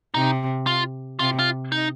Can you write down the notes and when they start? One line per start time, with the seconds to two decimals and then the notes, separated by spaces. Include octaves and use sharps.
0.14 C3 D#4
0.67 F4
1.19 C3 F4
1.39 F4
1.72 D#4